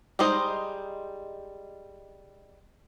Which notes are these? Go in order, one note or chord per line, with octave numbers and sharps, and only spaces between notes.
G3 G#3 D#4 C5 D#5